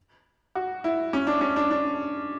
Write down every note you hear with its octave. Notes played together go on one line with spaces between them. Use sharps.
F#4
E4
C#4
D4
C#4
D4
D4